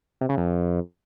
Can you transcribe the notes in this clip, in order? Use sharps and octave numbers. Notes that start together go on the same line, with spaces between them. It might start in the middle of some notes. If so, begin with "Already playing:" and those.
C3
C#3
F2